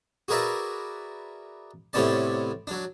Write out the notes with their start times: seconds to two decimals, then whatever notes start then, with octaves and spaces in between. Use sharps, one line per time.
0.28 F#4 G#4 A#4 B4 D5 E5
1.93 A2 C3 B3 C#4 D5 A5
2.67 F#3 D4